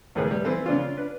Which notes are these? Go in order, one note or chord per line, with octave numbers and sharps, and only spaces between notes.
C#2 A2 D#3 G#4 B4
G3
E3 C4 A4 B4
C#3 D4 F4
D4 B4